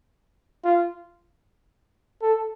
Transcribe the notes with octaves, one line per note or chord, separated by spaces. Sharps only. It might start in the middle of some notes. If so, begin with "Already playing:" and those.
F4
A4